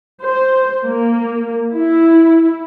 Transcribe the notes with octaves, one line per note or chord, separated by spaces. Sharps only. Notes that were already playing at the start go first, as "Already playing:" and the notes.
C5
A#3
E4